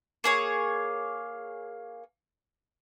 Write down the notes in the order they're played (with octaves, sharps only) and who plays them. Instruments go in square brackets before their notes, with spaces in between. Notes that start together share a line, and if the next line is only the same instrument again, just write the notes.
[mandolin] A#3 G#4 C#5